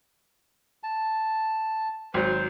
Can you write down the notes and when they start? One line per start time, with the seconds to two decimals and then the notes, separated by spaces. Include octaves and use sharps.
0.83 A5
2.14 G#1 F#3 C5